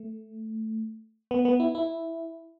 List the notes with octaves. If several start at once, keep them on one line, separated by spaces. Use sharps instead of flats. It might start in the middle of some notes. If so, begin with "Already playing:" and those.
Already playing: A3
B3
B3
E4
E4